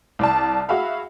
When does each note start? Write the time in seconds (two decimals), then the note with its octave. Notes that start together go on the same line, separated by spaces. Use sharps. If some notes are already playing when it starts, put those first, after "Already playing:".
0.19 C2 D5 A5
0.69 F#4 G#4 E5 F5 B5